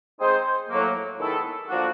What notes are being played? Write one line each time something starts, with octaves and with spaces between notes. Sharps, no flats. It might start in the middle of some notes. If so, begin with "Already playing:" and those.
G#3 C4 D#4 G#4 C5
A2 F#3 A#3
D#3 G#3 B3 E4 A4
D3 F3 A#3 D4 F#4